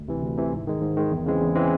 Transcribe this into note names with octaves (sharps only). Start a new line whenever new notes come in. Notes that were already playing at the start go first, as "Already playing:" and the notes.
Already playing: D2
C3 E3
D2
C3 E3
G#2
D#3 G#3
G#2
D#3 G#3
E2
C#3 E3 G#3 C4
E2
C#3 E3 G#3 C4